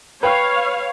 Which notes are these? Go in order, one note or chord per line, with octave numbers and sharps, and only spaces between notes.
B4 C#5 F5 G5